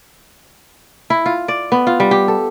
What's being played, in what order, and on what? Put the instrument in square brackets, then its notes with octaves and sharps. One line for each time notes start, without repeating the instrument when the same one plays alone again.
[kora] E4
F4
D5
B3
F4
G3
G4
A4